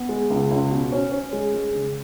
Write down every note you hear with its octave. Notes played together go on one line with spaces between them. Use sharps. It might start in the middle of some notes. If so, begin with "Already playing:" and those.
Already playing: B3
G#3
C#2
C#2
B2
C#4
C#4
G#3
G#3
C#3